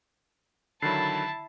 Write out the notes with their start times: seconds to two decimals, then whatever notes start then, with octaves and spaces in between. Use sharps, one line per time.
0.82 D3 D#3 F#3 E4 A5 B5 A6 C7